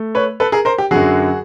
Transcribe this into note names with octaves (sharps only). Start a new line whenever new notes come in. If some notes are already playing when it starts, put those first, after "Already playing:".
Already playing: A3
B4 C#5
A4 B4
G#4 A#4
A#4 C5
G4
F#2 D3 F#3 F#4 G#4